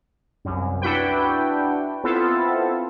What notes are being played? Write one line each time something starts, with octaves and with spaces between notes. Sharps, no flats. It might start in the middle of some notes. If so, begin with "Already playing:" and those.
C2 F#2
D4 E4 F#4 B4 G5
B3 C4 E4 F4 A4